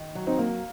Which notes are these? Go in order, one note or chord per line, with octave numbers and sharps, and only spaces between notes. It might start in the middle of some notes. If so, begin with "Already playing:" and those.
Already playing: D#3
F#3
C4 D#4
A#3